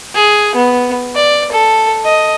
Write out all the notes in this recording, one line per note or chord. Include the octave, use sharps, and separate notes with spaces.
G#4
B3
D5
A4
D#5